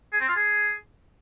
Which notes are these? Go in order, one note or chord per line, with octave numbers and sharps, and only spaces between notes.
G#4
C4
F4
G#4